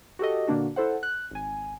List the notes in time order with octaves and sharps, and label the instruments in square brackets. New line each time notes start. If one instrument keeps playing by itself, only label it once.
[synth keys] F#4 G4 A4 D#5
A#2 D3 A#3 D4 F#4
E4 A4 C5 F#5
F#6
G#1 G#5